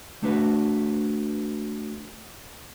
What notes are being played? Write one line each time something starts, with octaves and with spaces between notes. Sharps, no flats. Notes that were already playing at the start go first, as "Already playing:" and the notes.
A3 D4 F#4 B4